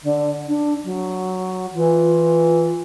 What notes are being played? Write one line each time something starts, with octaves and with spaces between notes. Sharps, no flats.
D3
D4
F#3
E3 F4